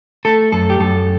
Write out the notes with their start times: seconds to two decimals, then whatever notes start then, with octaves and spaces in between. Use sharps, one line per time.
0.25 A3 A4
0.52 F#2 A4
0.70 G4
0.80 F#2 A4